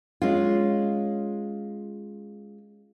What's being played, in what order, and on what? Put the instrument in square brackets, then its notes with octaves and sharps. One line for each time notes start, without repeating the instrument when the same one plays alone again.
[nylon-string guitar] G#3 C#4 F4